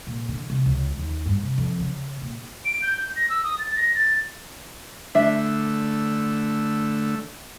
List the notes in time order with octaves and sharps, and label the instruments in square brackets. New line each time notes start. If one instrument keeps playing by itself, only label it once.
[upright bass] A#2
D3
C3
C#2
D#2
G2
C3
F2
C#3
A#2
[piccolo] D7
G6
G6
A#6
E6
D#6
A6
A#6
A6
[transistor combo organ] D3 A3 E6 [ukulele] D4 E5